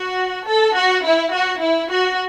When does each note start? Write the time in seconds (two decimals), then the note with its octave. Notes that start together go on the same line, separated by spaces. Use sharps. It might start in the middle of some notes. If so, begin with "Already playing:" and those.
Already playing: F#4
0.48 A4
0.76 F#4
1.05 E4
1.33 F#4
1.62 E4
1.90 F#4